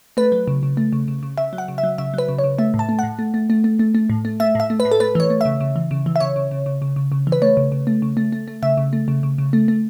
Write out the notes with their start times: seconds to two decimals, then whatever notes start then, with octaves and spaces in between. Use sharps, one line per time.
0.17 A3 B4
0.32 F#3
0.48 C#3
0.63 C#3
0.77 A3
0.93 C#3
1.08 C#3
1.23 C#3
1.38 C#3 E5
1.53 F#3
1.58 F#5
1.68 C#3
1.78 E5
1.83 F#3
1.98 C#3 E5
2.14 F#3 B4
2.29 C#3
2.39 C#5
2.44 C#3
2.58 A3 E5
2.74 A2
2.79 A5
2.89 A3
2.99 A2 F#5
3.19 A3
3.34 A3
3.50 A3
3.64 A3
3.79 A3
3.95 A3
4.10 A2
4.25 A3
4.40 A3 E5
4.55 A2 E5
4.70 A3
4.80 B4
4.85 A2
4.92 A4
5.00 A3 B4
5.15 E3 C#5
5.30 A3
5.41 C#3 E5
5.61 C#3
5.76 E3
5.91 C#3
6.06 E3
6.16 E5
6.20 C#3 C#5
6.36 C#3
6.51 C#3
6.66 C#3
6.82 C#3
6.96 C#3
7.12 C#3
7.27 E3
7.32 B4
7.42 A3 C#5
7.57 C#3
7.72 C#3
7.87 A3
8.02 C#3
8.17 A3
8.32 A3
8.48 A3
8.63 C#3 E5
8.77 C#3
8.93 A3
9.08 C#3
9.23 C#3
9.38 C#3
9.53 A3
9.68 A3